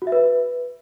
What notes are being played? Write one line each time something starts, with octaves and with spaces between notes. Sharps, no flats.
F#4
E5
B4